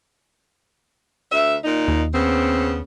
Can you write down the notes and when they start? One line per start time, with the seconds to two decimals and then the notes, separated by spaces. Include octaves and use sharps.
1.31 D2 E5
1.65 A#2 D#4
1.88 D#2
2.14 C#3 B3 C4